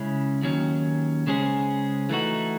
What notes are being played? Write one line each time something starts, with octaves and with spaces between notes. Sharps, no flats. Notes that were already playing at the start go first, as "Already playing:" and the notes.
Already playing: C#3 G#3 C#4 E4
D#2 D#3 F#3 C#4
C#3 G#3 C#4 G#4 C5
E3 A3 D#4 F#4